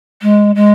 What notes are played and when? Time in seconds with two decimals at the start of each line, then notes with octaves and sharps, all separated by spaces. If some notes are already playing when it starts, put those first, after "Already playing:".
0.22 G#3
0.55 G#3